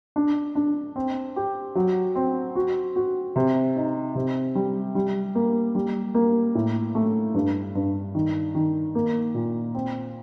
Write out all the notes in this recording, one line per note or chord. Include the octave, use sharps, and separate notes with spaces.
D4
D4
C4
G4
F#3
C4
F#4
F#4
C3
D#4
C3
G3
G3
A#3
G3
A#3
A2
A3
G2
G2
D#3
D#3
A#3
A#2
C4